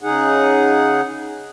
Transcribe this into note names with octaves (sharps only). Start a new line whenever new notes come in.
C#3 D#4 G#4 F#5